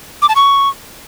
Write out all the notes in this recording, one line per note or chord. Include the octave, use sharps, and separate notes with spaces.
D6
A5
C#6